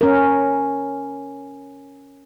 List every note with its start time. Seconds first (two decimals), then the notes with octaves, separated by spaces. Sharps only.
0.01 C#4 A#4